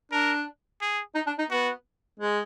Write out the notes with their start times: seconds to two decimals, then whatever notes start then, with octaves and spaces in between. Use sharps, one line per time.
0.12 D4 A#4
0.82 G#4
1.15 D#4
1.26 D4
1.39 D#4
1.50 B3 F#4
2.20 G#3